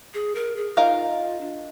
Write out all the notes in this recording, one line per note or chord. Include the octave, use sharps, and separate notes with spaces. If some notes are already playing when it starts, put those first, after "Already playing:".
G#4
A#4
G#4
D#4 F4 A#4 F5
D4